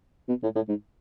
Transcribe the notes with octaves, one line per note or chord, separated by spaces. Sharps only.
B2
A2
A2
G#2